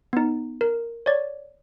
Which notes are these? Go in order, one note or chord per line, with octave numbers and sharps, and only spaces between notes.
B3 D#4
A#4
C#5 D5